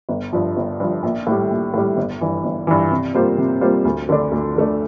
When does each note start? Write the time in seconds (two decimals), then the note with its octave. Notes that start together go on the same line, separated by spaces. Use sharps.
0.09 G1
0.33 G2 F3
0.57 G1
0.80 G2 F3
1.03 A#1
1.27 A2 G3
1.51 A#1
1.74 A2 G3
1.97 G1
2.21 G2 E3
2.44 G1
2.67 G2 E3
2.91 C3
3.14 G3 A#3 F4 C5
3.38 C3
3.61 G3 A#3 F4 C5
3.85 D2
4.09 D3 A3 D4
4.31 D2
4.56 D3 A3 D4